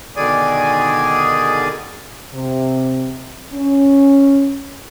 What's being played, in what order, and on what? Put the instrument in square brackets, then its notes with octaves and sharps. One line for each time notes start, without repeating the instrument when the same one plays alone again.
[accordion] B2 D3 D#3 G#4 D5 G#5
[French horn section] C3
C#4